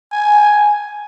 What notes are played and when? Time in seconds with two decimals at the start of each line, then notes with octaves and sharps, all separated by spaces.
0.12 G#5